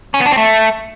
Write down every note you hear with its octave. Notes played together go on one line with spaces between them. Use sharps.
C#4
B3
D4
C4
A3